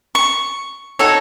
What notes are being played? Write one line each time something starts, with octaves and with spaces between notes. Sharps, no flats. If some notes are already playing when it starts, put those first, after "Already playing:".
C#6
D#4 F#4 A4 C#5